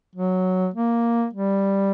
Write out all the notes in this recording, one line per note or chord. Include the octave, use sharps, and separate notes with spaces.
F#3
A#3
G3